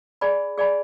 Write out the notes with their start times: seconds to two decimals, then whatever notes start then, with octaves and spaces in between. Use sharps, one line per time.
0.21 G#4 D5 G#5 B5
0.58 G#4 D5 G#5 B5